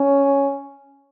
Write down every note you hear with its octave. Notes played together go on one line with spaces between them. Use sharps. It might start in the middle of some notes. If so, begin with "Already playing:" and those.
Already playing: C#4